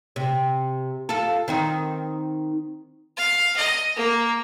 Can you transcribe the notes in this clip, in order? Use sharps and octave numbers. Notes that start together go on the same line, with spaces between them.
C3
F4 A4
D#3 C4 D#4
F5
D#5
A#3